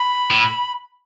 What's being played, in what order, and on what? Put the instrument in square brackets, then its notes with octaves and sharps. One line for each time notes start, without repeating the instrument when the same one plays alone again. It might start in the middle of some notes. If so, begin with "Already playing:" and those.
Already playing: [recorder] B5
[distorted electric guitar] A2